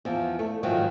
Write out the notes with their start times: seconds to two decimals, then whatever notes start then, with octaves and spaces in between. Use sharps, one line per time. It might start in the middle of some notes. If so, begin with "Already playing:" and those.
0.05 E2 F3
0.39 A3
0.63 G#2 D#3 F3 F#3